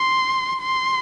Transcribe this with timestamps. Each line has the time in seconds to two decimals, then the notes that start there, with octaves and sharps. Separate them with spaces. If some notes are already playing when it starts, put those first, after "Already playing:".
Already playing: C6
0.62 C6